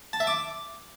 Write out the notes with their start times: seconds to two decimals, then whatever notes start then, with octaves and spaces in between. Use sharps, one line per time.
0.13 A5
0.20 E5
0.27 D6